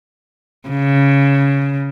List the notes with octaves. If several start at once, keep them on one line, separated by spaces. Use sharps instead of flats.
C#3